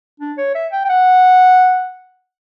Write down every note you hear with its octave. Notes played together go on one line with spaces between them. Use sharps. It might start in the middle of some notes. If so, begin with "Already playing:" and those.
D4
C#5
E5
G5
G5
F#5